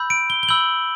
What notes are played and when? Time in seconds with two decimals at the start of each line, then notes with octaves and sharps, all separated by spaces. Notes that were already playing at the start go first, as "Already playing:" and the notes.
Already playing: B5 E6 G6
0.10 D7
0.30 G7
0.43 G7
0.49 B5 E6 G6 F#7